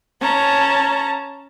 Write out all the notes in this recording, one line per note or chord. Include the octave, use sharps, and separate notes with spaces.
C#4 A5 A#5